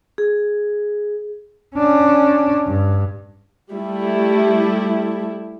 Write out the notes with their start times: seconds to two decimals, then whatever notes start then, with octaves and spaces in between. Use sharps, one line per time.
0.18 G#4
1.76 C#4 D4
2.67 G2
3.72 G3 A3 E4